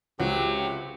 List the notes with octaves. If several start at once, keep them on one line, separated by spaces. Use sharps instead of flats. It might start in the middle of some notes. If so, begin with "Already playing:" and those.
C#2 C3 F#3 G4